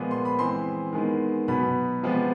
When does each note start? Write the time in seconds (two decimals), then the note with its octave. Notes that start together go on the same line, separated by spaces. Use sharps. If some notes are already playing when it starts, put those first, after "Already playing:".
Already playing: A#2 F3 G#3 B3
0.11 C6
0.25 B5
0.38 E3 G#3 C4 C6
0.93 D#3 G#3 B3
1.48 B2 F#3 B3 B5
2.03 C3 F3 G#3 B3